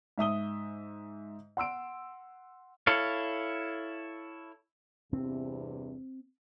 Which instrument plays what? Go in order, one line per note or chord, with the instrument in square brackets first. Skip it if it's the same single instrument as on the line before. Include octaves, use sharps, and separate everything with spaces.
[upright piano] G#2 E5 D#6 G7
F#5 C6 E6 D7
[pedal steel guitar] E4 A4 C#5 F5
[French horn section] E2 G2 C3 [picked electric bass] C4